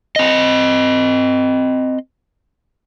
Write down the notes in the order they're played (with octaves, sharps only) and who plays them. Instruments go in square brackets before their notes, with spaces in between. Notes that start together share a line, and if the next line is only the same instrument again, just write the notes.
[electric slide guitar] C4 D#5